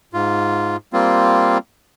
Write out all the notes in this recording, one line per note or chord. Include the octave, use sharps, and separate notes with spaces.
G#2 F4
G3 A#3 C4 F4